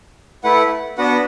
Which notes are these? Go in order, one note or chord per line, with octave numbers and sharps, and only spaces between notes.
A3 E4 B4 F#5
B3 D4 F#4 B4 F#5